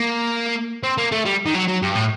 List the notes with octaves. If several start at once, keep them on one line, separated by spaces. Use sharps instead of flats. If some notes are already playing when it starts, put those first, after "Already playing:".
Already playing: A#3
C4
A#3
A3
G3
D#3
F#3
F#3
G2
A2